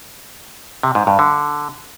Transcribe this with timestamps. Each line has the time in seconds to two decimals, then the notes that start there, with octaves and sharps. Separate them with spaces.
0.83 C3
0.95 G#2
1.07 G2
1.19 D3